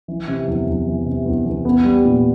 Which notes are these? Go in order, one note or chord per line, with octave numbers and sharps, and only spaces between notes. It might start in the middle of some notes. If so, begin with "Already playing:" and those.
E3
C3
E2
E2
E3
C3
E2
E2
B3
G3
A#2